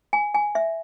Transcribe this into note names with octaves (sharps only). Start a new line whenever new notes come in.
G#5
G#5
E5